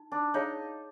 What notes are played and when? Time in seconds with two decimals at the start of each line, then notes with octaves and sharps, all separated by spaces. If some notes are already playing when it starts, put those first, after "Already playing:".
Already playing: D#4
0.12 D4
0.34 D#4 G#4 C#5 F5 A5